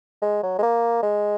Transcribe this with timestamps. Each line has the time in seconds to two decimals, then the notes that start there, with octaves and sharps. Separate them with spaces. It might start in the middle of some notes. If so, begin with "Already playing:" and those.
0.22 G#3
0.43 F#3
0.59 G#3
0.63 A#3
1.03 G#3